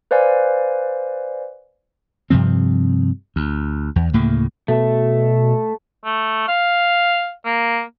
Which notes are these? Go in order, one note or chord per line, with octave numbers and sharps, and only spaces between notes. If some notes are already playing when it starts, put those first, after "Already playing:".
B4 C5 D5 F5 G#5
G2 C3 F3 C4
D2
E2
D2 A2 C#3 A#3
B2 A3
A3
F5
A#3